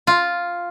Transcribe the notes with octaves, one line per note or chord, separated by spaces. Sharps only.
F4